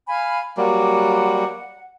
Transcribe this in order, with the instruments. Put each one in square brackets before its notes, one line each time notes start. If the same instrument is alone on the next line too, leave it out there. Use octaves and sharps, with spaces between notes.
[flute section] F5 G#5 B5
[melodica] F#3 G3 A#3 [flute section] F#5